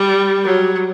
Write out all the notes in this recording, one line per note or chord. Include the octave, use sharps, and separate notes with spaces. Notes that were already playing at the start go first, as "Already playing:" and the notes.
Already playing: G3
F#3